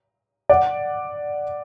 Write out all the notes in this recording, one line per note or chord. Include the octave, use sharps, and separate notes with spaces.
D5 F#5